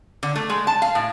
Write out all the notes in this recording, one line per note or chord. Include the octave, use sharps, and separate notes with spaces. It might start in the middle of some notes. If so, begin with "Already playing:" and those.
D3
A3
G#3
A5
F5
A2